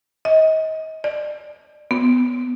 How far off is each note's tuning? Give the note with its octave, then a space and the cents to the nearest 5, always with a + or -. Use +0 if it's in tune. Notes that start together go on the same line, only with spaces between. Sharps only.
D#5 +30
D5 +35
B3 +10